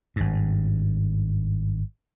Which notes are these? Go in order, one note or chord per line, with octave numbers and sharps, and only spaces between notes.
G#1 G2